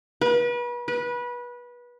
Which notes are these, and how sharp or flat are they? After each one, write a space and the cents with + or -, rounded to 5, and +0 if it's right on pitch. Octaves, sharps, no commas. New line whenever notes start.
B4 -35
B4 -25